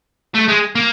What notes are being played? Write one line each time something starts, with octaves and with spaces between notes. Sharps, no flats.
A3
G#3
A#3